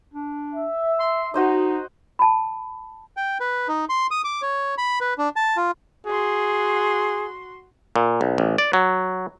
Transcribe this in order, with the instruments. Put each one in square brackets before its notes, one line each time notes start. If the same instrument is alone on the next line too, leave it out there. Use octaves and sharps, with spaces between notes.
[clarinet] D4
[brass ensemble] E5
[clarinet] C6
[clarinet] D#4 [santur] F#4 C5 D#5
[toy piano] A5 B5
[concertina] G5
B4
D#4
C6
D#6
D6
C#5
B5
B4
D4
A5
F4
[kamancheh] F#4 C6 [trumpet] G#4
[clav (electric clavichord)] A#2
B1
A1
D5
F#3